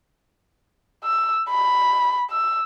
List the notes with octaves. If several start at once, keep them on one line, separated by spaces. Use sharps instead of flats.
E6
B5
E6